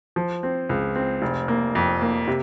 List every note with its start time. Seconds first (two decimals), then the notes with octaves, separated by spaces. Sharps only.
0.16 F3
0.43 C4
0.69 C#2
0.96 C4
1.22 F1
1.48 A#3
1.75 F2
2.01 A#3
2.28 C3